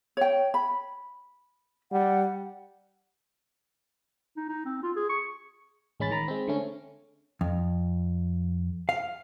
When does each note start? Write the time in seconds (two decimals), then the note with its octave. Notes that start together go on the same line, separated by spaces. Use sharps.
0.17 C#5 G5
0.54 B5
1.92 G3 F#5
4.37 D#4
4.49 D#4
4.66 C4
4.83 F4
4.96 G#4
5.09 C#6
6.00 A1 G#3 C#4 B5 A6
6.11 D#3 A#5 B5
6.28 G#3 C4
6.48 D3 A3 C#4
7.41 F2
8.89 F5